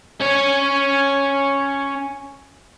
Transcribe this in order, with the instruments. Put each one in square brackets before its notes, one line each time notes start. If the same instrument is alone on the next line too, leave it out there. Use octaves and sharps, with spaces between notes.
[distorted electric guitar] C#4 C#5